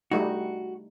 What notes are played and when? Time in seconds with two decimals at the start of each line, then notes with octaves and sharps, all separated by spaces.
0.11 G3 A3 D#4 F#4